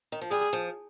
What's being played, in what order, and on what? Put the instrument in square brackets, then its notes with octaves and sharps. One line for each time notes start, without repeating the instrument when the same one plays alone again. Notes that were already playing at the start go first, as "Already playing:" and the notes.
[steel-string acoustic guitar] D#3
F3
[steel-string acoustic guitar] G3 [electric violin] G#4
[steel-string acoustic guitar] F3